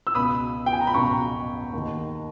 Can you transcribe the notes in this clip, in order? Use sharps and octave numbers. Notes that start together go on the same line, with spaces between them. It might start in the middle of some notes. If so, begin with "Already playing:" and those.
E6
C#2 B2 B5 D#6
G5
G#5
A#5
B5
C#2 B2 A#5 C#6
D#2 D#3